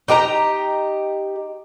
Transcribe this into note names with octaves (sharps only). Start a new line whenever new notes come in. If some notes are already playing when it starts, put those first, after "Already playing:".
D#4 G4 A#4 A#5